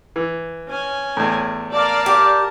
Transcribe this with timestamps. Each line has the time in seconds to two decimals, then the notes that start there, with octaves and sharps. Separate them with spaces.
0.16 E3
0.68 C#4 G#5
1.17 E2 A2
1.73 A#4 D5 F5 A5
2.06 G4